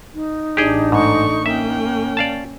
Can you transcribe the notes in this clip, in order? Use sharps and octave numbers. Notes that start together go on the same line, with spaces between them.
D#4
A1 D4 G4 G#4 G5
G#2 A3 C#6
A#3 C#4 E5 G5
D5 F5 A5